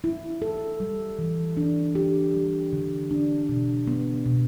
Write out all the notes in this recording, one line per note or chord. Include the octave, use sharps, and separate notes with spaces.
E4
A4
G3
E3
D4
G4
G3
D3
D4
B2
B3
B2